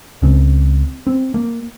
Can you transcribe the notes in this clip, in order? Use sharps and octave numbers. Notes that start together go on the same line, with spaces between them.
C#2 C#3 C4
C4
A#3